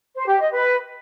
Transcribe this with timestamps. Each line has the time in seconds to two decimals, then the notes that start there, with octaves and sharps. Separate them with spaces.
0.16 C5
0.28 G4
0.40 D#5
0.52 B4